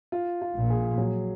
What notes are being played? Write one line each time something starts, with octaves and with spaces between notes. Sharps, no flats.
F4
F4
A#1 A#2
G#4
F#3